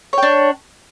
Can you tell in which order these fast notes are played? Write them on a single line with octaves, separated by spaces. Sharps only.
C#5 G5 D4